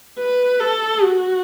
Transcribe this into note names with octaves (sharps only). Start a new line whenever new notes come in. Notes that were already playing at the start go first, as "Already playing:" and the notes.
B4
A4
F#4